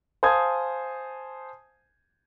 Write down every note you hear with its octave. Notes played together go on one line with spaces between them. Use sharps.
C5 F5 G#5 A5 D#6 G#6